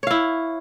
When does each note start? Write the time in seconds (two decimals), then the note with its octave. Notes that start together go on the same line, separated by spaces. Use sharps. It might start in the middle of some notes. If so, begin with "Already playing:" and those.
0.03 C#5
0.07 F5
0.11 E4